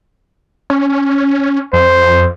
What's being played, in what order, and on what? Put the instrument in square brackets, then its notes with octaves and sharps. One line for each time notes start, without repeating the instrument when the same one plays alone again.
[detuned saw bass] C#4
[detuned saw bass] F2 [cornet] C5